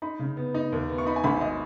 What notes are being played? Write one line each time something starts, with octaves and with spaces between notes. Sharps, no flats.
D#4 B5
C#3
B3
D#4
D#2
B3
C#6
D#4 B5
G#5
G#1 B5
D#5